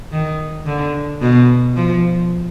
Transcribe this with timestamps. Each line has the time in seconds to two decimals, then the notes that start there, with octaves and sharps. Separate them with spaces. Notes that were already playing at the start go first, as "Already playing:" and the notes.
0.12 D#3
0.66 D3
1.21 B2
1.76 F3